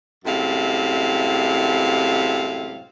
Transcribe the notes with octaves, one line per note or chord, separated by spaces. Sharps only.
F#2 A2 C3 G#3 F5